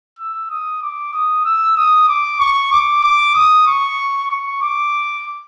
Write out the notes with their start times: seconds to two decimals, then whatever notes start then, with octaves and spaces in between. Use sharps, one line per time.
0.19 E6
0.50 D#6
0.82 D6
1.13 D#6
1.46 E6
1.77 D#6
2.09 D6
2.40 C#6
2.72 D6
3.03 D6
3.35 D#6
3.67 C#6
4.31 C#6
4.62 D6